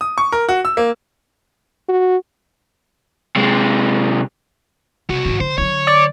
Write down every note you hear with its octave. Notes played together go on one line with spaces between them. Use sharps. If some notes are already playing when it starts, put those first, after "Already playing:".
D#6
C#6
A#4
F#4
E6
A#3
F#4
C3 G#3
C2 C3 F#4
G#2 D#3
D3 C5
D3 F#3 C#5
D5